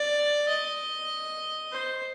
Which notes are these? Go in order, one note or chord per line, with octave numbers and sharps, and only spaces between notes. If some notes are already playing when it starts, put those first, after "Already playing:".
Already playing: D5
D#5
C5